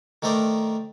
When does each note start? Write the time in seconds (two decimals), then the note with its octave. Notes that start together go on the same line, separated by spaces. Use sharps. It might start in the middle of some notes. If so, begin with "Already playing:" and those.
0.22 D#3 A3 A#4 C5 D5